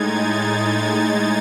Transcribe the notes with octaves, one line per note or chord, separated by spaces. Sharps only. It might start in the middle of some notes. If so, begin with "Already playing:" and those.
Already playing: A2 G#3 D#4 G#6 A6
A6
G#6